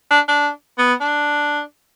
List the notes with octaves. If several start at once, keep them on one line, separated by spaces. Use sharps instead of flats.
D4
D4
B3
D4